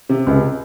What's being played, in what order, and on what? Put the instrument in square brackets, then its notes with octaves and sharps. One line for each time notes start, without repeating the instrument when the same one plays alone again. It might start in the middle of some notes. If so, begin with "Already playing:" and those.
[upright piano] C3
C#2